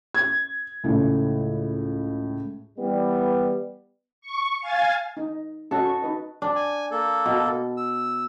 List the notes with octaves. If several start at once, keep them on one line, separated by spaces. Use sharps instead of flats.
G#6
C#2 A2
E3 G3 B3
C#6
F5 G#5 A6
D#4
C#4 F#4 A4 D#5
C#6
D#4 B4 D#5
D4
G#5
A#3 A4
B2
E6